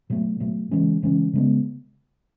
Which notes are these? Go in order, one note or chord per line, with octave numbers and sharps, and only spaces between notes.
B2 F#3 A3
B2 F#3 A3
C#3 E3 G#3 C#4
C#3 E3 G#3 C#4
C#3 G#3 B3